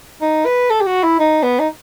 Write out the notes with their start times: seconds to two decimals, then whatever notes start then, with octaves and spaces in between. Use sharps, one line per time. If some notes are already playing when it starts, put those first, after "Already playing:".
0.21 D#4
0.46 B4
0.70 A4
0.81 G4
0.86 F#4
1.03 E4
1.20 D#4
1.43 B3
1.59 D#4